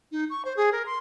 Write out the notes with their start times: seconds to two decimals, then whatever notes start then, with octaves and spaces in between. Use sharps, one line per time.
0.12 D#4
0.30 C#6
0.45 C5
0.57 G#4
0.72 A#4
0.86 C6